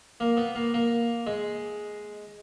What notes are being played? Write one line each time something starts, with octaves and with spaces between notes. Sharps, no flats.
A#3
B3
A#3
A#3
G#3